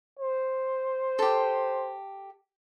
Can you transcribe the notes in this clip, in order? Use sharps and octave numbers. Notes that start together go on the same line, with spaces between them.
C5
G4 A4